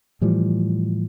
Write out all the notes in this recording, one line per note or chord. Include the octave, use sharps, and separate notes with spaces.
A2 E3 F3 G3